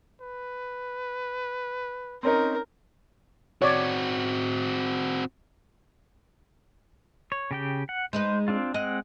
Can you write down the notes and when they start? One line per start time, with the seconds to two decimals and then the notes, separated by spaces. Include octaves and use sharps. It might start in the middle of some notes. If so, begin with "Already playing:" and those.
0.21 B4
2.23 C4 C#4 D#4 A#4
3.62 C4 F#4 C#5 D5
7.32 C#5
7.51 C#3 G4 G5
7.89 F#5
8.13 G#3 D#4 B4 C5
8.48 C4 D4 F4
8.74 G#3 C4 D#5 F#5